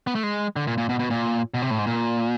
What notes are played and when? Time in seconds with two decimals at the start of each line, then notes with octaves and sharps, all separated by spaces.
0.07 B3
0.15 A3
0.23 G#3
0.56 D3
0.67 A#2
0.78 A#2
0.89 B2
0.99 B2
1.10 A#2
1.54 B2
1.62 C3
1.70 A2
1.78 G#2
1.87 A#2